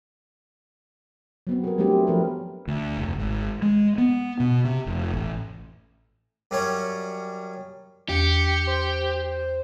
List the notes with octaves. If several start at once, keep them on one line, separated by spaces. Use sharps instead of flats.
F#3 B3 C4
G#4 A#4
F#3 G3 A3 C4 D4 G4
F3 A#4 B4
D2
F1
G#1
G#3
B3
B2
C3
F1
A1
F#2 G3 C#4 C#5
E2 G4 C#7
C5